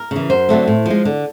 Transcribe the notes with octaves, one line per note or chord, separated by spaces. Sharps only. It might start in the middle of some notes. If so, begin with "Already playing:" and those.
Already playing: A#4
C#3 E3
F#2 C5
D3 F#3 A3 C4
A2
F3 G#3
D3